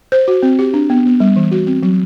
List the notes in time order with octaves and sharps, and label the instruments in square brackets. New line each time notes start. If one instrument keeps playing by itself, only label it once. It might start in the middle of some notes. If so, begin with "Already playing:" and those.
[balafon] C5
F#4
C4
G4
D4
B3
B3
G3
E3
F#4
C4
F#3